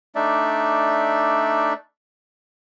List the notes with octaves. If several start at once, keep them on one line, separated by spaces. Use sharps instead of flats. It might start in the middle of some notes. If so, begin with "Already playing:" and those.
A3 D4 D#4 D5 E5